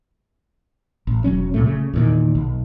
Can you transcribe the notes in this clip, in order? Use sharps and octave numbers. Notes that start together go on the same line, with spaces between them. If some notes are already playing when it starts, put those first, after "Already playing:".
A1
E1 F#3 C#4
C2 A#2 A3
C#3 A3
E2 A#2 D#3
B1